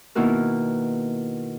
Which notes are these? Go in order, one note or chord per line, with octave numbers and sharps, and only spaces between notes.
B2 D#3 A#3 E4 F#4 A#4